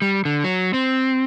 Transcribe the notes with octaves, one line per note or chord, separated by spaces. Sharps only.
G3
D3
F#3
C4